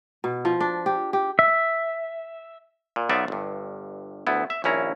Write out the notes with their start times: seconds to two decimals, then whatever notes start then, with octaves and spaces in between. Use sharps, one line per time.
0.24 B2
0.45 F3
0.60 D4
0.86 G4
1.13 G4
1.39 E5
2.96 A#2
3.09 B1 B3 D#4 F4 D5 E5
3.28 G1 G2
4.27 D2 B3 E4
4.50 E5
4.64 A#1 D#2 C#4 E4 A#5